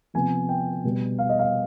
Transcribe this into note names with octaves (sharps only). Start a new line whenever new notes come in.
C3 F3 B3 G#5
G5
B2 G3 B3
F5
D#5
F5